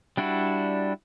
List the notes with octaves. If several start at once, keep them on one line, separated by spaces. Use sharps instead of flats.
G3 D4 E4 F#4